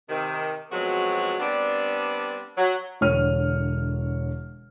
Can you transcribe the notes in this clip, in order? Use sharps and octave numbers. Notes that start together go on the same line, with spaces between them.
C3 D#3
B2 F3 F#3 G#3 C4 F#4
G3 B3 C4 D4
F#3
E1 D3 C#5 F6 D#7